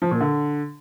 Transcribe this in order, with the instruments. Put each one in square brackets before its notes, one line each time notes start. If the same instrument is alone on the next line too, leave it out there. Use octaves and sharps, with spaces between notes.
[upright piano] F3
A#2
D3